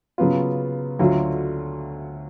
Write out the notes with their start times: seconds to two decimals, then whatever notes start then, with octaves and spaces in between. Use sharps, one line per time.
0.18 C#3 F#3 B3 F4
0.99 D2 D3 F#3 A3 F4